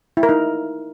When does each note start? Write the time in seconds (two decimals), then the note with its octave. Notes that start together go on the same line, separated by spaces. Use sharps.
0.17 E4
0.23 A#4
0.29 D#4